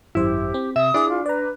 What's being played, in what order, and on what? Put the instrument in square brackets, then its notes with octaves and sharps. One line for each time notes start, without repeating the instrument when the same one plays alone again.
[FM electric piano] G#1 F#2 C5 [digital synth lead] E4 [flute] G4
[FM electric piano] C4
[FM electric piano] C3 [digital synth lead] E5 [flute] D#6
[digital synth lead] D4 [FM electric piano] E4 G#4 D5
[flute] F4
[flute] B4 [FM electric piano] D5 A#5